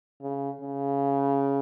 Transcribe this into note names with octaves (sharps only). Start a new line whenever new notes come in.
C#3
C#3